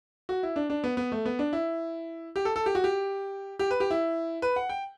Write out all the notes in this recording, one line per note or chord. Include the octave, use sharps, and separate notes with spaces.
F#4
E4
D4
D4
B3
B3
A3
B3
D4
E4
G4
A4
A4
G4
F#4
G4
G4
B4
G4
E4
B4
F#5
G5